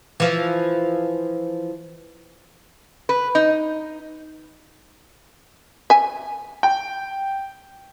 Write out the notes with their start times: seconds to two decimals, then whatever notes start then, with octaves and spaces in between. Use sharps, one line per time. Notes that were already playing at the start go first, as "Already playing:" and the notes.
0.20 E3 F3
3.09 B4
3.35 D#4
5.90 E5 G#5
6.63 G5